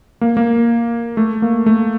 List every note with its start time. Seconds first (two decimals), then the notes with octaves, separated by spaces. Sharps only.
0.21 A#3
0.37 A#3
1.17 A3
1.42 A#3
1.66 A3